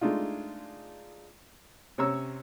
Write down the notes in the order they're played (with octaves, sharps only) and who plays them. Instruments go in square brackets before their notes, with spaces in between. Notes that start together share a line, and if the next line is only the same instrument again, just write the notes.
[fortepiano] G#3 A3 D4 D#4 F4
C3 C#4 C#5 A#5 E6